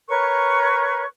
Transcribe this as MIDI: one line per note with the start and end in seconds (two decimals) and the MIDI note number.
0.08 1.03 70
0.08 1.03 71
0.08 1.03 73
0.08 1.03 85